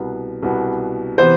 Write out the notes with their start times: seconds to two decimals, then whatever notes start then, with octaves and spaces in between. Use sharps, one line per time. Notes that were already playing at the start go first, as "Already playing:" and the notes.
Already playing: C2 B2 B3
0.42 C2 B2 B3
1.18 C3 E3 B3 C5